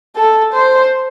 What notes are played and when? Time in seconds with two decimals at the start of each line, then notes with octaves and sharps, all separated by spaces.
0.16 A4
0.54 C5